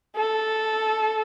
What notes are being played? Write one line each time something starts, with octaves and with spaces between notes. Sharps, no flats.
A4